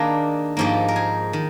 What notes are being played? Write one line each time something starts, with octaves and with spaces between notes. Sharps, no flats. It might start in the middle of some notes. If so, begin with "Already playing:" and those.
Already playing: D#3 A#3 D4 G#4 A#4
G#2 F3 A#3 D#4 G4
A#4
G#4
D#3